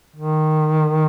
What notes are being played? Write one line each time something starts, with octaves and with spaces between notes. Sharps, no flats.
D#3